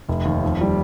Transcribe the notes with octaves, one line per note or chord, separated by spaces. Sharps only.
F1
D#2
F2
G3